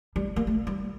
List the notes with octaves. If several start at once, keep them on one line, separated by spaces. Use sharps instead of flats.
G3
A#3
A3
G3